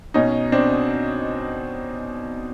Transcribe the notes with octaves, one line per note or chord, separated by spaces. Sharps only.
B2 C#4 D#4
C4 D4